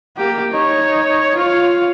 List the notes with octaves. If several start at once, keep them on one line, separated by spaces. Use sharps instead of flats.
A#3 G4
D#4 C#5
F4 C#5